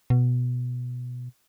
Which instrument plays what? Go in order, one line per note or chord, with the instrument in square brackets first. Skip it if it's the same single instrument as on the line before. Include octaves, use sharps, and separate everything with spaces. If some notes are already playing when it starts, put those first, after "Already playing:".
[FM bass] B2